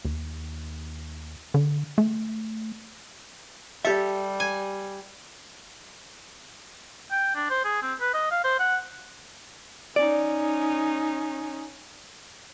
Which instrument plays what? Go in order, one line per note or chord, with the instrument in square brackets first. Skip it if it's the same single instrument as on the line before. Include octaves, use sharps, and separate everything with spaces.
[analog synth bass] D#2
D3
A3
[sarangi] G3 [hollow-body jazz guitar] G4 E5 [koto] A4
[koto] G#5
[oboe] G5
D4
C5
G#4
C4
B4
D#5
F5
C5
F#5
[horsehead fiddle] C#4 D#4 [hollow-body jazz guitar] D5